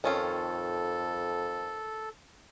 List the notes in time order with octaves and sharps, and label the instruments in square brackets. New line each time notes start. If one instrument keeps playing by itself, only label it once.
[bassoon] F2 [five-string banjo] D#3 C#4 F4 [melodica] A4